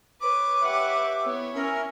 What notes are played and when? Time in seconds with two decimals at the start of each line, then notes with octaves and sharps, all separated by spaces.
0.21 B4 C#5 D6
0.62 G4 E5 F#5
1.25 B3 E4 C#5
1.55 C#4 A#4 E5 G#5